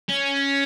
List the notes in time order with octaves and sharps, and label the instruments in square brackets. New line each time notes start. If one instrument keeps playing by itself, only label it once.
[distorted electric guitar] C#4